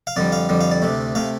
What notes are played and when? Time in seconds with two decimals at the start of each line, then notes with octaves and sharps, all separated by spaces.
0.07 F5
0.16 F2 D3 G3 D5
0.32 F5
0.49 F2 D3 G3
0.61 F5
0.71 D5
0.82 D2 C3 A3
1.15 C3 A3 F5